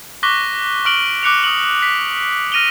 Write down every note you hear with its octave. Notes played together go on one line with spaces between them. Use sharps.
C#6 D6 F#6 A#6 B6 G7
C#6 F6 D7 F#7 G7
D6 F#6 C#7 F7
D#6 F#7
B6
F6 A#6 D#7 F7 G7